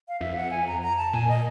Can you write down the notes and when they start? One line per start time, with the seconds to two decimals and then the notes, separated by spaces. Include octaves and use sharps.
0.08 F5
0.20 F2 E5
0.36 F#5
0.51 G#5
0.67 A#5
0.82 A#5
0.97 A5
1.13 A#2 G#5
1.28 D#5